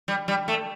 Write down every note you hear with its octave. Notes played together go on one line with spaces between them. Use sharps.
G3
G3
A3